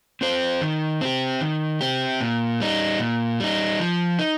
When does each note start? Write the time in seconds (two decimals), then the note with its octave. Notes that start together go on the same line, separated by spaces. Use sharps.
0.21 C4 F4 C5
0.61 D#3
1.01 C4 G4
1.41 D#3
1.81 C4 G4
2.21 A#2
2.60 G3 D#4
3.00 A#2
3.40 G3 D#4
3.79 F3
4.19 D#4